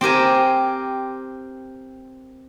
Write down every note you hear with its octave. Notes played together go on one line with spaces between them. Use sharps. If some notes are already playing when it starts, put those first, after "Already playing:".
C4 G4 A#4 G#5